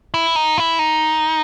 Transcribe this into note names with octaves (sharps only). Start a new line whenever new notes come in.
E4
D#4
E4
D#4